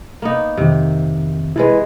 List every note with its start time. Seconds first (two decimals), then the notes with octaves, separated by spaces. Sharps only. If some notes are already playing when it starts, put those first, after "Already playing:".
0.22 A#3 B3 D#4
0.57 F2 C3 D#3
1.56 C3 E3 G#3 E4 B4